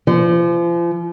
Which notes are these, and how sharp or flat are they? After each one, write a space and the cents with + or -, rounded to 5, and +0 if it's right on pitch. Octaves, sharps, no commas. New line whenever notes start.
F3 -35